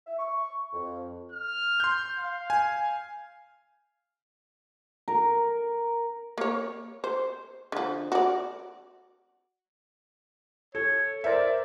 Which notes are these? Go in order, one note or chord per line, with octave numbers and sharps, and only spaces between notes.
E5
C#6
F2
F6
C6 G6
F5
G#5
A#4
A#3 C#5
C5
D3 F3
F#4 D5
A4 C#5
A#4 C5 D5 E5